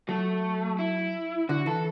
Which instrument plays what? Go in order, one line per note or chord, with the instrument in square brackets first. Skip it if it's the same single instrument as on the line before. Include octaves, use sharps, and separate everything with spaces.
[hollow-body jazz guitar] F#3 [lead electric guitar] A3
[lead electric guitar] E4
[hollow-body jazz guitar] D3 [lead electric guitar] F#4
[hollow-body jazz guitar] E3 [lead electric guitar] A4